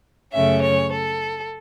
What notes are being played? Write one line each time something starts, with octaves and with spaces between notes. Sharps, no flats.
F#2 C#3 A3 C#4 E5
C#5
A4